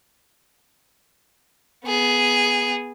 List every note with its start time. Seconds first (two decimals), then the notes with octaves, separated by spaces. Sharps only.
1.85 B3 G#4